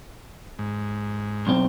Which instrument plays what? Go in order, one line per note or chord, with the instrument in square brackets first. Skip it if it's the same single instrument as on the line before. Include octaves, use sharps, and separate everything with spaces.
[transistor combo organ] G#2
[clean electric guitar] B1 C4